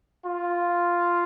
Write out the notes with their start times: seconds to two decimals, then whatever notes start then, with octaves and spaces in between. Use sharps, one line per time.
0.25 F4